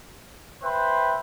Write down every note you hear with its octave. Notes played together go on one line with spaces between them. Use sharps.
B4 C5 E5 G5 C6